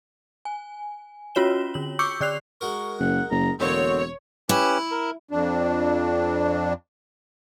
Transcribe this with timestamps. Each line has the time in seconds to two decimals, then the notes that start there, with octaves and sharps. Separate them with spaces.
0.45 G#5
1.35 C#4 F4 F#4 C#5 E7 G7
1.74 D3 F#7
1.99 C#6 D6 E6 G6 C#7
2.21 D3 D5 F#6 C7 F7
2.61 G#3 F#4 A#4 C#6
3.00 F#1 F#5
3.31 F#1 A#5
3.60 E1 B2 D3 A#3 C4 C#5
4.49 C#4 E4 G4 B4
4.91 A#4
5.31 F2 D4